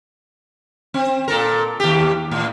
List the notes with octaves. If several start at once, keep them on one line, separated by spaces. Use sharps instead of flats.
C4
A#2 A4 A#4
D#2 G4
A2